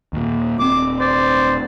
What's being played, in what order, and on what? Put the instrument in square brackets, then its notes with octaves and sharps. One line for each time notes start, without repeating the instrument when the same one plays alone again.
[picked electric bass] D#2 A#2
[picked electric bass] D#1 C4 [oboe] D6
[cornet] C5 [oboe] D5